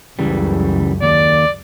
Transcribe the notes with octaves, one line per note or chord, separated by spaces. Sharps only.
C#2 F#2 C#3 E3 G3
D#2 D5